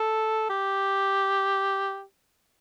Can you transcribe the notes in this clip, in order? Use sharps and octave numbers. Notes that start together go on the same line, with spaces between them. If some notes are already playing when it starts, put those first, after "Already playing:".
Already playing: A4
G4